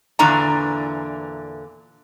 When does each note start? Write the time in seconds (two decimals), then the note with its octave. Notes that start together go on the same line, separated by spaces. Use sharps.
0.19 E2 A#2 D3 E3 D4 A#5